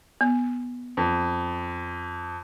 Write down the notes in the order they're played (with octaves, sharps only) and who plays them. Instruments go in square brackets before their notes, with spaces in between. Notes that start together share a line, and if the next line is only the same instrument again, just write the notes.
[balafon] B3
[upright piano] F2